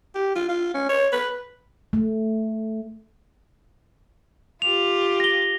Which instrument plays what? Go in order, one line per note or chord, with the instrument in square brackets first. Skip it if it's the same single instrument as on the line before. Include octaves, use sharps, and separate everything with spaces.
[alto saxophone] G4
F4
F4
C#4
C#5
B4
[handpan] A3
[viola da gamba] F4 G4 [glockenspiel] F7
[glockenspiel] A#6 G7